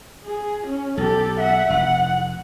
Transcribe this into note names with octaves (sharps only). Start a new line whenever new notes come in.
G#4
C#4
B1 G4 A4
E5 F#5
F1 F#5